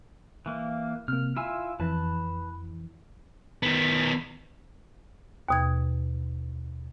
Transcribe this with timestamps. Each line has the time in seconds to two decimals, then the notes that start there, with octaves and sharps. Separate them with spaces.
0.46 E3 A#3
1.08 C3 A#3 F6
1.37 E4 F4 G#5 E6
1.80 F2 E3 B4 A5
3.63 D#3 B3
5.48 D#2 B2 G#6